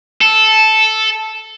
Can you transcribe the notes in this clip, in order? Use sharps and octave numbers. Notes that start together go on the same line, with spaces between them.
A4